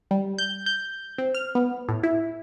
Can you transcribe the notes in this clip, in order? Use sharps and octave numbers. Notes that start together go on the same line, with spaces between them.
G3
G6
G6
C4
F6
B3
A2
E4